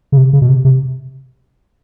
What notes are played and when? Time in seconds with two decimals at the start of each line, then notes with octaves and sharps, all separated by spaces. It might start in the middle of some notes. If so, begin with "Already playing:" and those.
0.12 C#3
0.17 C3
0.33 C#3
0.42 B2
0.49 C3
0.65 C3